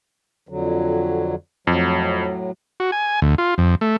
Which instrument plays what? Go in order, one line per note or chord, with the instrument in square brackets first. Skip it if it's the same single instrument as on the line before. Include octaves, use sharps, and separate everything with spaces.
[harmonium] F2 D3 F#3
[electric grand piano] F2 [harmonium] A2 F#3
[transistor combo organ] F#4
G#5
D2
F4
F2
A3